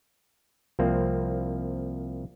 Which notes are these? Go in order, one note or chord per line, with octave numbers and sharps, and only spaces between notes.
C2 F3 A#3 C4